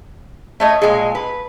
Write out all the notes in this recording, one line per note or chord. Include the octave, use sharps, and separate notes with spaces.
A3 C#5 D#5
A#2 G#3
B4